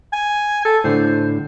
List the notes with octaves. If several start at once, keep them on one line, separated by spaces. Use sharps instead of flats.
G#5
A4
A2 D3 C5